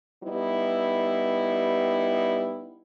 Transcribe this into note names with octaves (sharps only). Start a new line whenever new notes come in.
G3 B3 D#4 E4